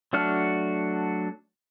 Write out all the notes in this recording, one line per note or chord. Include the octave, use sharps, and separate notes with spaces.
F#3 A3 D4 F#4 F6